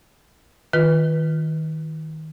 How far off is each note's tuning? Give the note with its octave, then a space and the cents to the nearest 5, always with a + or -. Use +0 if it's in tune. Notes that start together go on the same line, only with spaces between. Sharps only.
D#3 +15 F4 +0 B4 -5